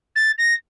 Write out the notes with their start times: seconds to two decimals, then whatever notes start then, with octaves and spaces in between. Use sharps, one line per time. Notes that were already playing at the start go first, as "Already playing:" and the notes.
0.15 A6
0.38 A#6